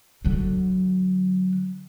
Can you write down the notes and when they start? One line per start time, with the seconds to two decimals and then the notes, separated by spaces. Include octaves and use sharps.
0.25 D3 F#3